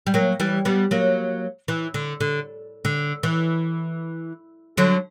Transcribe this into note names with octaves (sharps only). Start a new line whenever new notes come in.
G3
F#3 A#3
E3 G3
G3 B3
F#3 A#3
E3
D3
D3
D3
E3
D3 F#3